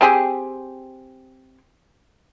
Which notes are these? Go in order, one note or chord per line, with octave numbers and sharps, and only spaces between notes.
C4 G4 G#4